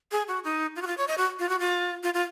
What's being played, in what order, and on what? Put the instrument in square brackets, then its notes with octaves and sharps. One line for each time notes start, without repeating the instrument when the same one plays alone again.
[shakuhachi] G#4
F#4
D#4
F4
F#4
F4
C#5
D#5
F#4
F4
F#4
F4
F4
F4